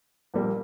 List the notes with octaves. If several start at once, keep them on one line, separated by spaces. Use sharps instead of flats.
A#1 A#2 G3 A#3